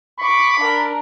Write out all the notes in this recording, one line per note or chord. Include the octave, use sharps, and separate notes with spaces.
B5 C#6 D6
D4 A#4